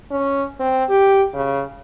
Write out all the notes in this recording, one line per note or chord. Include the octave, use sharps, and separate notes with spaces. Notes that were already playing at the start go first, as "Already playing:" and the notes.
C#4
C4
G4
C#3